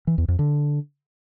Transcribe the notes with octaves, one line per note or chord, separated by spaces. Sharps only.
E3
E2
F2
D3